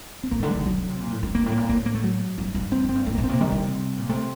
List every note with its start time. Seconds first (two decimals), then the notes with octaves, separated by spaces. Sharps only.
0.23 C4
0.31 A2 A#3
0.40 D3 A3
0.49 G3
0.55 D3
0.57 D#3
0.66 D3 F#3
0.78 D3
0.89 C3
1.00 A#2
1.12 A2
1.23 G2
1.35 G2 A#3
1.46 A2
1.52 A#3
1.57 A#2
1.69 A2 A#3
1.86 A#3
1.95 A3
2.04 F#3
2.38 G2
2.55 G2
2.72 F#2 C4
2.84 F#2
2.89 C4
2.95 G2
3.06 A2 A3
3.15 A#3
3.18 A#2
3.24 C4
3.29 C3 A#3
3.40 D#3 G3
3.52 D3
3.64 C3
3.98 A#2
4.09 C3 A3